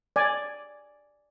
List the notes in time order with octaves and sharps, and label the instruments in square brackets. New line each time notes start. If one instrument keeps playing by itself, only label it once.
[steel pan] D5 G#5